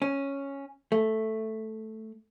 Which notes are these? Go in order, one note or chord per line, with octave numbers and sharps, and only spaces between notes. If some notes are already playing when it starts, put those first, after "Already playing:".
C#4
A3